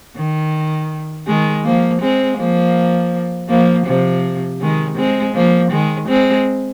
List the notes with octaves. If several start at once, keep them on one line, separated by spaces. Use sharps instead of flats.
D#3
D#3 G#3
F3 A#3
G#3 C4
F3 A#3
F3 A#3
C3 F3
D#3 G#3
G#3 C4
F3 A#3
D#3 G#3
G#3 C4